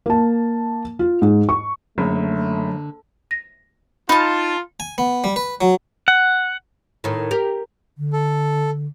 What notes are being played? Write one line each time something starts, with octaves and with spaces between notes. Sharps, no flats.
A#3 A5
F4
G#2
C#6
F#1 D3 F#3 A3
A#6
D#4 F4 A5 B5
G#5
B3
G3
B4
F#3
F#5
A2 D#3
G4 A#4
D3
A4